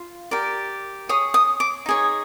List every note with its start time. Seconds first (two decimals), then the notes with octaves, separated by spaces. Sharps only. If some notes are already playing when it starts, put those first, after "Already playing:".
Already playing: F4
0.31 G4 A#4 D5
1.09 G#4 C#5 D#6
1.34 D#6
1.60 D6
1.86 D#4 G#4 C#5